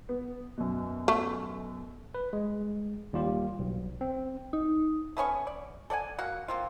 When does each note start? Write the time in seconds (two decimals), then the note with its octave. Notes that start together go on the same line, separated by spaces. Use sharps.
0.09 B3
0.57 F#2 B2
1.08 A3
2.15 B4
2.33 G#3
3.13 D#2 G3 F4 G4
3.59 B1
4.01 C4
4.53 D#4
5.17 A3 B3 C#4 C#6
5.47 D5
5.90 A4 D5 F#5 G#5
6.19 A#3 F#4 F5 F#5
6.48 A#3 C4 F4